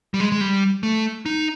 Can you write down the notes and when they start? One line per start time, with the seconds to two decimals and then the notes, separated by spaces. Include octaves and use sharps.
0.14 G3
0.20 G#3
0.32 G#3
0.41 G3
0.83 A3
1.26 D#4